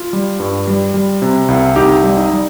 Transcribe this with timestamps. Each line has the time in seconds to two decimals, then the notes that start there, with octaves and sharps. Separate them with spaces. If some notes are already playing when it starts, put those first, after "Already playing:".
Already playing: F4
0.13 G3
0.40 G2
0.67 G3
0.94 G3
1.22 C3
1.48 C2
1.76 C2 D#4 G4
2.04 G3
2.17 D#4
2.31 G3